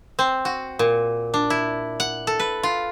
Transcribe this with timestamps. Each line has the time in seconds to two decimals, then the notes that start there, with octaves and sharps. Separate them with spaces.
0.19 C4
0.45 F#4
0.79 A#2
1.34 D4
1.50 E4
2.00 F#5
2.27 A4
2.39 B4
2.63 F4